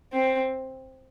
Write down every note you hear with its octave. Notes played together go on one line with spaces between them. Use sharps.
C4